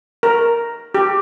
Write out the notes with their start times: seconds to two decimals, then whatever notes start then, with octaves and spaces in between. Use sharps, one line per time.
0.23 A#4
0.94 G4